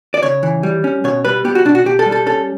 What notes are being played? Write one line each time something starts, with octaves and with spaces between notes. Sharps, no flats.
D5
C#3 C#5
E3
G3
C#4
B2 C#5
G3 B4
B3 G4
F#4
B2 D4
F#4
B2 G4
A4
G3
A4
C#4 A4